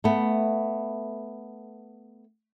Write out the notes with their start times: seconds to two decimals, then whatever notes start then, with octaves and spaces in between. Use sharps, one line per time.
0.04 A3 B3